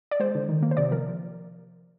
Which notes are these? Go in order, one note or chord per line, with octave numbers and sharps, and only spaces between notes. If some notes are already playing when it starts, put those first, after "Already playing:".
D5
G#3 C5
D3
D#3
A#3
C5
C3 D5
F3 A#4